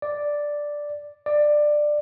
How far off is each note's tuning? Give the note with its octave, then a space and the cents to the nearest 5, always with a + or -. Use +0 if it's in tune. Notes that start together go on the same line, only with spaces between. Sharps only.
D5 +0
D5 +15